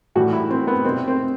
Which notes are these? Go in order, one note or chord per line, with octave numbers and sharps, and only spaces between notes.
A2 E3 G3 F#4
E4
C4
B3
C2 B2 G3 C4
C4